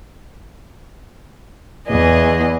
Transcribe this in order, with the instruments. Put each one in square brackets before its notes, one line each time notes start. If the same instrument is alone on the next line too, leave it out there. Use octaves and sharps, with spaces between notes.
[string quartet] E2 E3 G#4 D#5